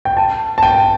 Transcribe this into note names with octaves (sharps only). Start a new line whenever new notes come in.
G5
A5
A5
G5